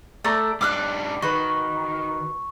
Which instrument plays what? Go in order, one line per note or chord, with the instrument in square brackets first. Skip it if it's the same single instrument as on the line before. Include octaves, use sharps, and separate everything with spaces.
[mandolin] A3 D5 A#5
[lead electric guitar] G#2 D4 [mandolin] D6 F6 F#6
[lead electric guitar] D#3 [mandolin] F#4 B4 [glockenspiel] C#6